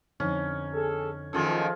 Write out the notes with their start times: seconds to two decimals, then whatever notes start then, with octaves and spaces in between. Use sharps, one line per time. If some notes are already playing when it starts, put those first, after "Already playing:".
0.20 F2 D3 C#4 D#4
0.74 G#4 A4
1.33 F#2 D#3 F3 A3 F4 G#4 A4